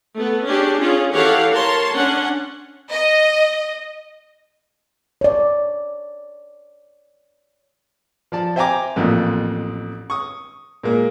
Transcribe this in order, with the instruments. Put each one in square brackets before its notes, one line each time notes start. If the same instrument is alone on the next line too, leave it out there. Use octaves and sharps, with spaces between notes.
[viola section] A3 B3
C#4 D4 G4 G#4
C#4 F4 G#4
E3 G4 A4 C#5 F5 F#5
A#4 C#5 A5 C6
C#4 D4 F#5
[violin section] D#5
[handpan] C#5 D5
[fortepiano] F3 D5 A5
C5 E5 G5 G#5 A#5 D6
A1 F2 A#2
C#6 D#6
A#2 G#3 A#3